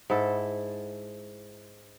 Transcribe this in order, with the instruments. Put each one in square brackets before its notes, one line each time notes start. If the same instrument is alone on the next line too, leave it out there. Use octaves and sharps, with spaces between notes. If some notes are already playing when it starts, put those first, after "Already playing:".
[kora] G#2 E4 A4